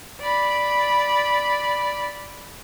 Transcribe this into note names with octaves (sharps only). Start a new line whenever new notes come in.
D5 B5